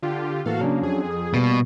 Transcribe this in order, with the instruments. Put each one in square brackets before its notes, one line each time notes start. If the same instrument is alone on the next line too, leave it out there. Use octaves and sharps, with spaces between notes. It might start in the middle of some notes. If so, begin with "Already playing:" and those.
[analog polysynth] D3 F4 G4
[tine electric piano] A2 E3 A#3 [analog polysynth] F#4 A4 F5
[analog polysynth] C#3 A#3 [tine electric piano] F#3 C#4 D4
[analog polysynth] F2 G#4
[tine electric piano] D#6
[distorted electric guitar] B2 [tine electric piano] G3 A#3